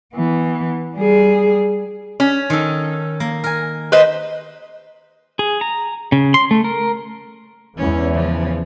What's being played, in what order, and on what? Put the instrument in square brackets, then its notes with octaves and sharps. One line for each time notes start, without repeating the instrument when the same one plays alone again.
[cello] E3 B3
G3 G#4
[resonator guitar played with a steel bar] C#4
[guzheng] D#3 A4
A#3
A#4 G#5
[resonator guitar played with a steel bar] B4 C5 D#5
[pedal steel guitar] G#4
A#5
C#3
C6
A3
A#4
[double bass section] E2 E3 [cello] G#3 C#4
[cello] C#3 F3